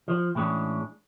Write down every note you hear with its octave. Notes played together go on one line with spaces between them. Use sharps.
F3
A2 E3 G#3 C#4 D4